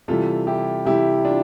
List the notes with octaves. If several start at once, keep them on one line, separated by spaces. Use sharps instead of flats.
C3 E3 G3 F4 A4
E4 G4
C3 E3 G3 E4 G4
D4 F4